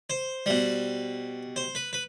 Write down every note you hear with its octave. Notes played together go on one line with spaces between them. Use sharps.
C5
B2 G3
C5
B4
B4